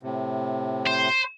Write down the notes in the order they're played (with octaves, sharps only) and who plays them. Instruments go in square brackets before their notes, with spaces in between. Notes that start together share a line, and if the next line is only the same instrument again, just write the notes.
[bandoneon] A2 C3
[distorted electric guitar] C5